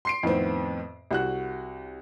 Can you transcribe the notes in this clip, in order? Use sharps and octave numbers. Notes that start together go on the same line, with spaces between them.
C6 C7 D7
F2 A2 D#3 B3 C4
C2 F#4 F#6